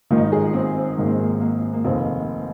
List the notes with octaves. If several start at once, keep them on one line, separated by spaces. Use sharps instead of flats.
G#1 G#2 D#3 F4
D#4
F4
G#4
C4
C4
G#1 G#2 D#3 A#3
C4
A#3
A#3
A#3
F1 D#2 D#3 C4